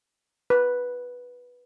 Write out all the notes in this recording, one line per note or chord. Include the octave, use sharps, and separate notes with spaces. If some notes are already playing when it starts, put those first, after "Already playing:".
B4